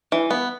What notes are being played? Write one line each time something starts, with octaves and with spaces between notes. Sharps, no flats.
E3
B3